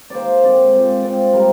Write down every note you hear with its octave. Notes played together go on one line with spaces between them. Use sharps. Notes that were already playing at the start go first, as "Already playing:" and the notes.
D#3 A#3 C5 D5
D3 G#3 C4 D5
A#2 G#3 C4
A#2 G#3 C4 D5
C3 G3 A#3 A#4